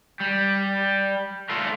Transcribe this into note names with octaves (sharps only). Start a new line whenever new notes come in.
G3
A3 F4